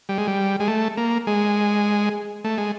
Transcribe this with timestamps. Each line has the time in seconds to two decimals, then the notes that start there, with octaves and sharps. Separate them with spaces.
0.09 G3
0.18 G#3
0.27 G3
0.60 G#3
0.68 A3
0.97 A#3
1.27 G#3
2.44 A3
2.58 G#3